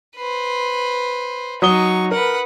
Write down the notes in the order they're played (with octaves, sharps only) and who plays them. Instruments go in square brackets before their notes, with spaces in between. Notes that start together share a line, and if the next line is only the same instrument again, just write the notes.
[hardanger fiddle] B4 C5
[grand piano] F#3 D#6 G7 [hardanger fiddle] D#4 C#6
[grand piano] A#4 [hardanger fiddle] B4 F#5